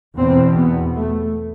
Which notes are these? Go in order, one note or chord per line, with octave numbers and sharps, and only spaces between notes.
E2 B2 C4
B3
A3